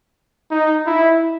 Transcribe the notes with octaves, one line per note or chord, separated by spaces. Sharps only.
D#4
E4